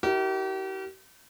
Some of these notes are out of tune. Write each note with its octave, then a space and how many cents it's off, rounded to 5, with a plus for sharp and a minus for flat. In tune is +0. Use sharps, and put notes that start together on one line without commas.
E4 -35 G4 -40 A#4 +0